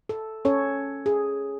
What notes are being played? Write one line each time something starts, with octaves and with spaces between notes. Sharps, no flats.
A4
C#4 A4 C#5
G#4